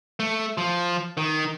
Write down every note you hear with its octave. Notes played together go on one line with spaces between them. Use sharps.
A3
F3
D#3